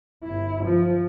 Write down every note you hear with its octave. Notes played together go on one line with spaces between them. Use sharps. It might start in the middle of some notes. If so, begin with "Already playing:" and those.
G1 E4
F3